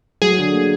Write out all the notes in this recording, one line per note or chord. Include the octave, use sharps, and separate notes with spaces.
F#3 G#4
D3
A#3